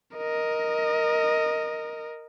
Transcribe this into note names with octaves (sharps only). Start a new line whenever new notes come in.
A#4 D#5